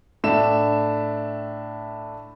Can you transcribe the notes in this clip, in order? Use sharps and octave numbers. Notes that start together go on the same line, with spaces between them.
A2 D4 E5 E7